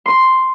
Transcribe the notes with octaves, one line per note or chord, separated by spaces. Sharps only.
C6